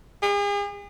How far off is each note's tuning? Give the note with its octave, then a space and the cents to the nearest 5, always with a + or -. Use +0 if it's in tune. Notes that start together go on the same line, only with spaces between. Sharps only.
G#4 -40